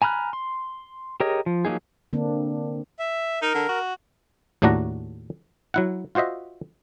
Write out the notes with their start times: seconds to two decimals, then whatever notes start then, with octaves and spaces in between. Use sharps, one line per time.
0.02 G#5 A#5 B5 F6 F#6
0.33 C6
1.20 G4 G#4 A#4 C#5 D#5
1.46 F3
1.65 F3 F#3 A#3 D#4 G#4
2.13 D3 A#3 C4 D4
2.99 E5
3.42 D#4 A#4
3.54 D3
3.69 F#4
4.62 D#2 A2 A3 D4 F#4 A#5
5.74 F#3 E4 F#5
6.15 F4 F#4 C5 D#5 E5